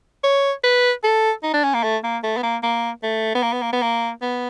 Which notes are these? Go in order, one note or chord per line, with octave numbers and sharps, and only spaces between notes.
C#5
B4
A4
D#4
D4
C#4
A#3
A3
A#3
A3
B3
A#3
A#3
A3
B3
A#3
B3
A#3
B3
A#3
B3